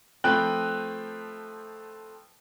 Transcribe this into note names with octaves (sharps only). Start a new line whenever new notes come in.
F3 A3 C4 B4 G5 F#6